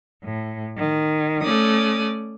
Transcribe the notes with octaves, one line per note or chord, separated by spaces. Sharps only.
A2
D#3
A3 C#4 D5 D#6